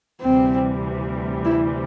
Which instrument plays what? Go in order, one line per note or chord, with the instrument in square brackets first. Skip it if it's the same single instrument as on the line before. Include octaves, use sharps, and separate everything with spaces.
[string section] D2 C3 E3 G3 [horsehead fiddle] C4
[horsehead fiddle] E4